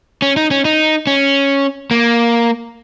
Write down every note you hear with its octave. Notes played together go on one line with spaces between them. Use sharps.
C#4
D#4
C#4
D#4
C#4
A#3